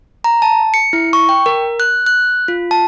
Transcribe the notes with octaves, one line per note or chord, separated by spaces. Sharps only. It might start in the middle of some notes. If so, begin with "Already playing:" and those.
A#5
A5
C#7
E4
C#6
G5
A#4
F#6
F#6
F4
A5